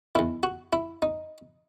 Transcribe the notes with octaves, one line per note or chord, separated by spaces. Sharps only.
E2 D#3 E4
F#4
E4
D#4